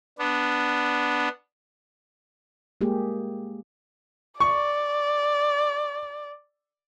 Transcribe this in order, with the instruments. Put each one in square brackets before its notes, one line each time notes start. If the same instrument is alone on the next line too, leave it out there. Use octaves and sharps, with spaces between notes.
[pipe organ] B3 D4
[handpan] G#3 A#3 G4 G#4
[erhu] D5 [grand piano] C#6